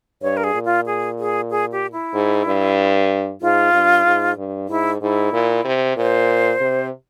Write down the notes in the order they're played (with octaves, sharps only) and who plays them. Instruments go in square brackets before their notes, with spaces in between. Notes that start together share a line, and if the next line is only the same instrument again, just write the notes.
[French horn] G2 [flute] C#5
[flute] A#4
G#4
[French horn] A#2
[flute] F4
G#4
G#4
G#4
G4
E4
[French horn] G#2
G2
[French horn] G#2 [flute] F4
[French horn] G2
G#2
G2
[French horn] G#2 [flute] E4
[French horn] G#2 [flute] E4
[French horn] A#2
C3
[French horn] A#2 [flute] C5
[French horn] C3